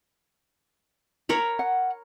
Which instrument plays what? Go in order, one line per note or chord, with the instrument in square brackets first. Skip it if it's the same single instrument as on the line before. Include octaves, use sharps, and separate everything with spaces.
[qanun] A#4 C#5 B5
[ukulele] F#5